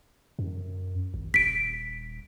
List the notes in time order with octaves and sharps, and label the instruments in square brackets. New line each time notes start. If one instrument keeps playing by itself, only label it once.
[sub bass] F#2
G#1
[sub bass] D#1 [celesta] B6 D7